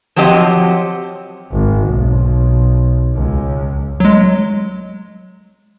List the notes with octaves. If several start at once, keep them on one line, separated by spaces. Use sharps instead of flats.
F3 F#3 C4 G4 D#5
G#1
B1
C#2
F#3 G#3